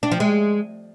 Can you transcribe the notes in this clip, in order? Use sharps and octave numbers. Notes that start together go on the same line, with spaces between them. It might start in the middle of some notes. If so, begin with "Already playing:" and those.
D4
F3
G#3